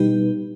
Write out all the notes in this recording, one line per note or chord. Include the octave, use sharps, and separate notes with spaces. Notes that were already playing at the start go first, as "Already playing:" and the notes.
Already playing: B2 G3 D#4 G4 B4